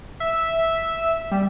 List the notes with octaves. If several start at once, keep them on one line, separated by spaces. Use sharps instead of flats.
E5
G3